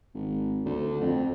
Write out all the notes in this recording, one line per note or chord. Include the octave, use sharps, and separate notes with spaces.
G#1
D2
F2